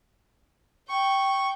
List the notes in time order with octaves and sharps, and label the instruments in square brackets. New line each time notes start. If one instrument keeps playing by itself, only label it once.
[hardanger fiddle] G5 [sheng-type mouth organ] C#6